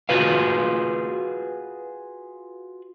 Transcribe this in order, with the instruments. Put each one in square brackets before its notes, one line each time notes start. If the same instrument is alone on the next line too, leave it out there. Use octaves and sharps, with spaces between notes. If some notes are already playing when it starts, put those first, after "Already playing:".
[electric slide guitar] F4 F#4 G#4 B4 F5